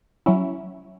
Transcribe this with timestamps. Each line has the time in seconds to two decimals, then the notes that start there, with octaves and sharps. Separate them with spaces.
0.26 F#3 C#4 E4